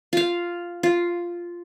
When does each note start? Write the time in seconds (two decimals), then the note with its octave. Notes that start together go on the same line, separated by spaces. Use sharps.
0.13 F4 F5
0.83 F4